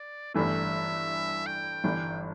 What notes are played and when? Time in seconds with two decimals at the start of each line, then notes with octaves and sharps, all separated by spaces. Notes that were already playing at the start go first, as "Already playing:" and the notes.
Already playing: D5
0.34 G1 G2 E3 A3 E5
1.46 G5
1.84 G1 G2 E3